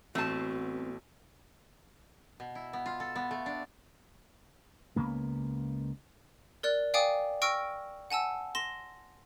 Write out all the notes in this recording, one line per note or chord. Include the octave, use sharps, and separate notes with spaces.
A1 A3 B3 C4 F#4 A5 C7 D#7
B2
E4
B3
F4
A4
B3
A3
D4
C#2 C#3 A#3 B3
A#4 D5 F#6
D5 F5 G5 G#5 D6 D#6
G5 C#6 E6 F6 A#6 D7
F#5 G#5 A5 E6
C6 A#6 E7